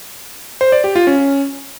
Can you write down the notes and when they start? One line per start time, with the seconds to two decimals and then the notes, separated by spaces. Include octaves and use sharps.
0.61 C5
0.72 D5
0.84 G4
0.95 F4
1.07 C#4